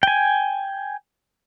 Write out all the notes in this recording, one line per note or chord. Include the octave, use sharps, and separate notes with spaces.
G5 G#5